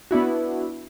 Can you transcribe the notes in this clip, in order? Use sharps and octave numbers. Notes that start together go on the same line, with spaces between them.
B3 D4 E4 F#4